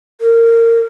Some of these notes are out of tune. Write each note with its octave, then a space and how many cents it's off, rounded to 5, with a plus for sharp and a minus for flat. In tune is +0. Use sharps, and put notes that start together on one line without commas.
A#4 -20